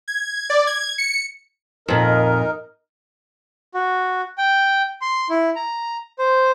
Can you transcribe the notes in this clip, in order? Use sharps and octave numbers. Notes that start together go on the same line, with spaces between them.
G#6
D5
G#6
C#7
F2 A#2 D#4 A#4
F#4
G5
C6
E4
A#5
C5